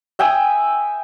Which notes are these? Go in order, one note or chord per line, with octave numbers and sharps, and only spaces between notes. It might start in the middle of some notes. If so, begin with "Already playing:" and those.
E5 G5 G#5 D#6